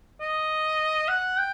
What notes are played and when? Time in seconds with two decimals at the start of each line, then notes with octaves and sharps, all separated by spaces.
0.21 D#5
1.08 F#5
1.38 G5